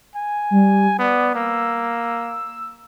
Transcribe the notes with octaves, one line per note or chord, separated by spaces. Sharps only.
G#5
G3
B3 D5
A#3 E6